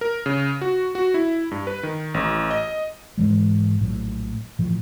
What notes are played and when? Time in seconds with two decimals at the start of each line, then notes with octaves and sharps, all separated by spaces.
0.01 A#4
0.26 C#3
0.61 F#4
0.95 F#4
1.14 E4
1.51 G2
1.67 B4
1.83 D#3
2.14 A1
2.51 D#5
3.18 G#2 E3 G#3
3.80 A#1 A2 F#3
4.59 A2 E3 F3